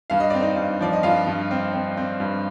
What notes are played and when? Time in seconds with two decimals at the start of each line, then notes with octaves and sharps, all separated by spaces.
0.10 G2 F5
0.20 D#5
0.30 C4 D5
0.41 D#4 D#5
0.56 G2
0.80 F3 D5
0.93 D#5
1.03 G2 F4 F5
1.27 G2
1.51 C4
1.73 C4
1.97 C4
2.20 G2